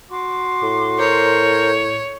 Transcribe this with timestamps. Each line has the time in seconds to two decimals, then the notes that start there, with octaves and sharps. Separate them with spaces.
0.10 F#4 C6 D6
0.62 A2
0.99 A#4 C5 C#5